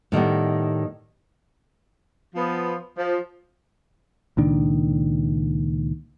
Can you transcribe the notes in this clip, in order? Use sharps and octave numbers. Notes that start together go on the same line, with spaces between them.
A2 D#3 G3 B3
F3 B3
F3
C#2 A#2 D#3 D4